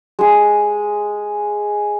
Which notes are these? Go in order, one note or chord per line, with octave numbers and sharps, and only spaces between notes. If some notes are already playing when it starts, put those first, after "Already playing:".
G#3 G#4